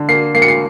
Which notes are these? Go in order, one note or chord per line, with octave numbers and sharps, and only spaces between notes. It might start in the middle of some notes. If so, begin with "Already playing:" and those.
Already playing: D3
A#3 C7
A#3 C7
C#7
C7